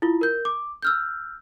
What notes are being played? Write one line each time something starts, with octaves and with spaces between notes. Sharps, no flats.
E4 F4
A#4 G6
D6
E6 F6 G6